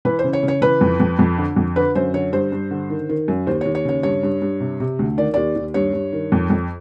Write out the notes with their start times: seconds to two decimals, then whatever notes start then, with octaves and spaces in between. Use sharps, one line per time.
0.05 E3 B4
0.19 C5
0.24 C#3
0.33 C#5
0.43 C#3
0.48 C#5
0.62 E3 B4
0.81 F2
1.00 F2
1.19 F2
1.38 D3
1.56 F2
1.76 D3 B4
1.95 F#2 C5
2.14 D3 C#5
2.33 G2 C5
2.52 G2
2.71 D3
2.90 D#3
3.09 D#3
3.28 F#2
3.47 D#2 C5
3.61 D#2 C#5
3.75 C#5
3.85 C#3 C#5
4.03 G2 C#5
4.23 G2
4.42 G2
4.60 C3
4.80 C3
4.99 D2
5.17 D#3 D5
5.34 D#2 D5
5.55 D#2
5.74 G2 C#5
5.93 G2
6.13 D#3
6.32 F2
6.50 F2